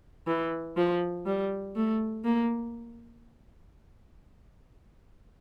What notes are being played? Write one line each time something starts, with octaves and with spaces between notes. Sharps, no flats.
E3
F3
G3
A3
A#3